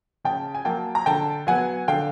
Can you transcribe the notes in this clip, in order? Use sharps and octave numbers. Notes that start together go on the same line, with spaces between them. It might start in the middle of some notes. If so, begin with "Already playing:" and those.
C#3 G5 A5
G#5
F#3 A#3 G5 A5
A#5
D3 G5 A5
F#3 B3 F#5 G#5
D3 F5 G5